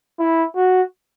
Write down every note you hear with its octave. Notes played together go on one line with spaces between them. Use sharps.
E4
F#4